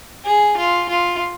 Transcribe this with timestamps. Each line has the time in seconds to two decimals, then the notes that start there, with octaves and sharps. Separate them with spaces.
0.25 G#4
0.57 F4
0.89 F4